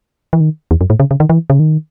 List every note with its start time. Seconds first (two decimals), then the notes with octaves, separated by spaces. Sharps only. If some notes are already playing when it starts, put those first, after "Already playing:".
0.33 E3
0.40 D#3
0.71 E2
0.81 F#2
0.90 A2
1.00 C#3
1.11 C#3
1.20 D#3
1.30 E3
1.50 C#3
1.59 D#3